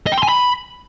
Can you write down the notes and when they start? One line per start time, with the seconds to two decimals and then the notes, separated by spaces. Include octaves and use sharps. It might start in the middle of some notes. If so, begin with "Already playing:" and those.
0.06 D#5
0.12 G5
0.17 C6
0.23 G#5
0.29 B5